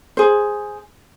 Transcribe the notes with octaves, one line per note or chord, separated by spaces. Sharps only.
G#4 C5